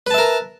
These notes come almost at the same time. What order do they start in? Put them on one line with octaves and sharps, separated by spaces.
B4 A5 E5 A#4